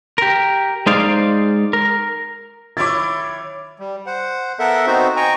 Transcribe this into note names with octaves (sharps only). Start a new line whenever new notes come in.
G4 A#4
G#3 D#4 G#4 C5 D5 F5
A#4
D#3 E4 C#5 D6 A6
G3
C5 F#5
B3 A4 A#4 E5 F#5
B3 C4 D#4 F#4 C5
D#5 G5 G#5 A#5 C#6